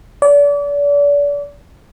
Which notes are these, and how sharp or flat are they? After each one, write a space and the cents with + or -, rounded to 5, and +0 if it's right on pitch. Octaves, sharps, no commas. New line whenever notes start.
D5 -35